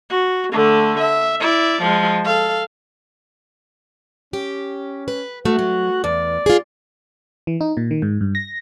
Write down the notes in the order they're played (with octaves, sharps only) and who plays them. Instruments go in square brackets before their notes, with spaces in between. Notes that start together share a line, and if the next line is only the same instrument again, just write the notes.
[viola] F#4
D3 A3
E5
E4 D5
F3 G#3
A4 F5
[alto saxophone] C#4 [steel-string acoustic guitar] G4
[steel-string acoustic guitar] B4
[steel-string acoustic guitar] A3 [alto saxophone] F#4
[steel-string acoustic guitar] F#3
[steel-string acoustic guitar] E2 [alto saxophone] D5
[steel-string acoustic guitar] F4 G#4
[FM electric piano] E3
D#4
A#2
D#3
G#2
G2
A#6